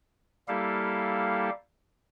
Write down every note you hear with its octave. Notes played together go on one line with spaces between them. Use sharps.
G3 A#3 E4 G4 A4 F5